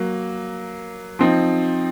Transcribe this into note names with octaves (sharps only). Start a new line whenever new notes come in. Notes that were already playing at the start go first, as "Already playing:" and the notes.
Already playing: F#3 A#3
F3 C4 D#4